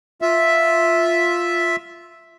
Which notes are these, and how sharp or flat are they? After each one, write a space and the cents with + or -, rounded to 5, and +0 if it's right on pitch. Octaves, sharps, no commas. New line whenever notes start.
F4 +0 E5 +0